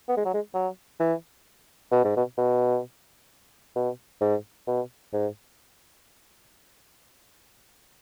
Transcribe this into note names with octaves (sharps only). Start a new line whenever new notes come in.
B3
G#3
F#3
G#3
F#3
E3
B2
G#2
B2
B2
B2
G#2
B2
G#2